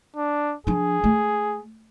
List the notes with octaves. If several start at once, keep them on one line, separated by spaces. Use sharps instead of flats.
D4
F3 D4 G#4
A3